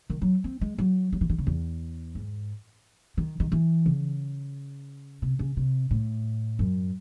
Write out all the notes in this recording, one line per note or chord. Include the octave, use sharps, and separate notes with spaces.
D#3
F#3
C4
G#3
F#3
F#3
E3
D#3
C#3
E2
G#2
D#3
D#3
E3
C#3
C3
C#3
C3
A2
F#2